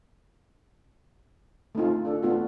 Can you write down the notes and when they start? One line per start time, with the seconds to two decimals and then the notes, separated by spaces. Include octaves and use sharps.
1.75 A3 C4 D#4 F4
2.05 D4 A4
2.23 A3 B3 D4 F4 F#4